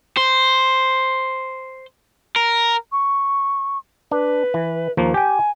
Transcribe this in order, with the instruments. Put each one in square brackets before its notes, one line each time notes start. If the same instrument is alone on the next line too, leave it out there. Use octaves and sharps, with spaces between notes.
[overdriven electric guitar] C5
A#4
[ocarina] C#6
[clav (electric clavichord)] D4 [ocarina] B4
[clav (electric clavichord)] E3
D#2 F3 A#3
[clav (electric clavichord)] G4 G5 [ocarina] G#5